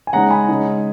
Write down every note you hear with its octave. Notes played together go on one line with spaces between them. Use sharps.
G#5
C#3 G#3 D#4 F#5 A#5
G#5 B5
C#3 G#3 D#4